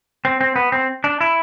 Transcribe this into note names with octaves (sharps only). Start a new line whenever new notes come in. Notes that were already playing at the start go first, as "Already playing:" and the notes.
C4
C4
B3
C4
D4
E4